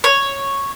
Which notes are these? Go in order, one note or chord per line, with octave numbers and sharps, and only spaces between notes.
C#5